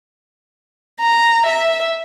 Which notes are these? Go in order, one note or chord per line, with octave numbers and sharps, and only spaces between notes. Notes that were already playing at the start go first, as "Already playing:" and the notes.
A#5
E5